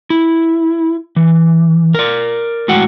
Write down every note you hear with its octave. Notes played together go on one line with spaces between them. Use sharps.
E4
E3
A#4 D5
A2 G#3 F#4 F#5 G5